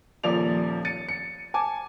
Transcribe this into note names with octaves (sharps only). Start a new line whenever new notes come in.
D#1 F3 A#3 D5 F7
A6 C#7 D#7
C#7
G#5 A5 D6